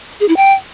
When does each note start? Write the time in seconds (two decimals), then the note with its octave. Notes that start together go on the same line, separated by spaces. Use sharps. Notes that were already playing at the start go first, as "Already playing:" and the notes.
0.20 G#4
0.28 E4
0.37 G5